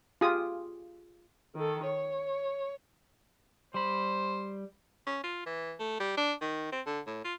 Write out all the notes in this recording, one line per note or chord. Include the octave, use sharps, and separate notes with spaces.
F4 G4 G#4 D#6
D#3 A4
C#5
G3 C5 B5
C#4
F4
E3
A3
G3
D4
D#3
C4
D3
A2
F4